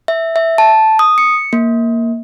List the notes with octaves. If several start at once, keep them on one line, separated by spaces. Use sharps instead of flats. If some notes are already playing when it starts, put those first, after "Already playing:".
E5
E5
A5
D#6
C#7
A#3